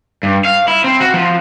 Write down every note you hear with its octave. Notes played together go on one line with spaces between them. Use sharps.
G2
F5
E4
C4
F#4
F3